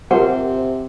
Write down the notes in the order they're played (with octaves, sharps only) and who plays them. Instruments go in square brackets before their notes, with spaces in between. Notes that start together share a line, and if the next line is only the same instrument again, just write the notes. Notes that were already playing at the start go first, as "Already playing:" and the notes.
[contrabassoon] C3 [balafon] F4 G4 A#4 [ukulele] C5 [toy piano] F#5